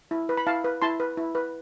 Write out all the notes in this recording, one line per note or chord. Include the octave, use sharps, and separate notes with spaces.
E4
B4
B5
E4 F5 A5
B4
E4 A5 C6
B4
E4
B4